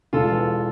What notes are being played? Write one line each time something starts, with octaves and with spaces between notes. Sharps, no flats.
E1 F4 A4
E3